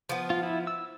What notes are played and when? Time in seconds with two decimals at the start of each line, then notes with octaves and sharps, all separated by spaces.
0.09 F3 B3
0.30 F4
0.43 E4
0.67 E6